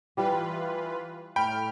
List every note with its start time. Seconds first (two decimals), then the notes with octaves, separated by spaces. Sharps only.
0.17 E3 G3 F4 G4 B4
1.36 A2 G5 B5 F6